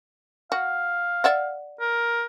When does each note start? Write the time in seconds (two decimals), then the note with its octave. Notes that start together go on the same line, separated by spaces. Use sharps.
0.52 F#4 F5
1.24 D5 E5 F#5
1.80 A#4